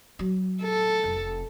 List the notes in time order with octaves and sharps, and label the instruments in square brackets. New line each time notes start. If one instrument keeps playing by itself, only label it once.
[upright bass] F#3
[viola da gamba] A4
[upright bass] F1